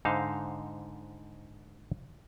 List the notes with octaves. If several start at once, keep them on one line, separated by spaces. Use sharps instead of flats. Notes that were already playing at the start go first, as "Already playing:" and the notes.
G#2 D3 D#4 C5 F5